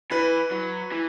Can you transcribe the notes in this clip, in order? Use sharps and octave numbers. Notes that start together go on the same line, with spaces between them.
E3 B4 B5
F#3
E3